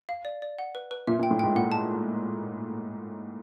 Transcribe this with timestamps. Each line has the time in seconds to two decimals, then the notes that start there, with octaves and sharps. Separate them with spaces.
0.09 F5
0.25 D5
0.42 D5
0.59 F#5
0.75 B4
0.91 B4
1.07 A#2 E5
1.19 A#2
1.23 G5
1.31 A2
1.39 G#2 G5
1.56 A#2 F#5
1.72 A5